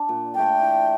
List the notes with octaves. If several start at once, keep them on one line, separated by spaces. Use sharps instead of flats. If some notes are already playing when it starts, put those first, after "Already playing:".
Already playing: D4
A#2
A3 D4 A4 G5
E3